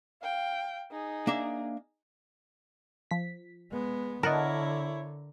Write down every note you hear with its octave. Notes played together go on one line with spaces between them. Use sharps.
F5 G5
D#4 G#4
A#3 D4 E5
F3 B6
G#3 B3
D3 E4 A#4 C#5 D#5 F#5 A5